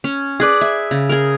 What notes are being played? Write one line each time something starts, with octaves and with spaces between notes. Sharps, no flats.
C#4
G#4 B4 D5
E5
C#3
G#4 A#4